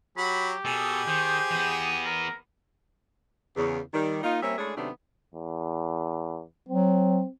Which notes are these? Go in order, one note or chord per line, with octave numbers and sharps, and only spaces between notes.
F#3 G4 B5
B2 G#4 A4
D#3 C5
E3 B3
A#4
E2 C#3
D#3 G3
A#3 D#4 F4
G3 A#3 C4 C#4 E5
G#3 A3 C#4 D4 E4 G#4
C3 D#3 F#3 A3 B3 D4
E2
F#3 C4